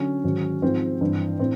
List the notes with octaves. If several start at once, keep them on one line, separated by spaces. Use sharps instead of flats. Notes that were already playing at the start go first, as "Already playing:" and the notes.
Already playing: D3 F#3 C#4
G#2 D#3 F#3
G#2 F3 C4
G2 E3
A2 C4